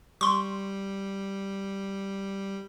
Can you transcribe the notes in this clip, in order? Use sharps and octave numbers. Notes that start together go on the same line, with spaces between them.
G3 C6 C#6